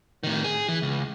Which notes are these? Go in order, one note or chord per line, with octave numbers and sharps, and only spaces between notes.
A2 D#3
G#4
E3
C#2